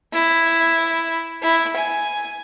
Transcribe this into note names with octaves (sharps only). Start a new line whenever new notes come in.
E4
E4
G#5